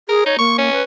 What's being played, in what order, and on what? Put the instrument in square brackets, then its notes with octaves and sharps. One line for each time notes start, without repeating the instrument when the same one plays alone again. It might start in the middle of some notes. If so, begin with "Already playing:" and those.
[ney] G#4 [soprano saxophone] A#4
[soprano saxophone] D#4 [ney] C#5
[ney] A#3 [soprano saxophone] C#6
[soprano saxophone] C#4
[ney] B4